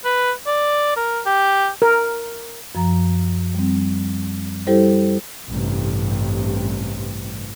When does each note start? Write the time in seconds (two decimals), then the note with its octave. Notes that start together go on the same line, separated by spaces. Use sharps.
0.05 B4
0.47 D5
0.96 A#4
1.26 G4
1.82 A#4
2.75 F#2 F3 A#5
3.55 G3 C4
4.67 G3 E4 G4 A4 C5
5.49 A1 G2 C3